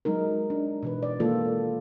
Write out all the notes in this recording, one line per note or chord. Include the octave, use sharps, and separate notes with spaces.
F#3 G#3 D#4 A#4
D4
B2 E3 B4
D5
D#3 E3 G#3 A#3 F4 A4